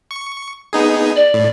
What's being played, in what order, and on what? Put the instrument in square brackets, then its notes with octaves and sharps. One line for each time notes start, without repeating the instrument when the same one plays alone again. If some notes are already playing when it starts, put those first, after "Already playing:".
[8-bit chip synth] C#6
B3 D#4 G#4
[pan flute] D5
[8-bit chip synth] A2